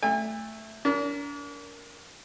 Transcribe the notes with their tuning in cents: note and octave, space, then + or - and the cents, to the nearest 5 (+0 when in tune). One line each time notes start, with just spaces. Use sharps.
A3 +0 G#5 -45
D4 -40 A#4 +0